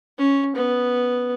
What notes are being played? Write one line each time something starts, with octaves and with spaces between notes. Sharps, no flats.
C#4
B3